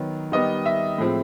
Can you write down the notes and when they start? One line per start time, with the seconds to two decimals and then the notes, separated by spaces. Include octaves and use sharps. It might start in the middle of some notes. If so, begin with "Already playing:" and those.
Already playing: D#3 F#3 B3
0.32 D#3 G3 B3 D#5
0.66 E5
0.98 A2 F3 G#3 C4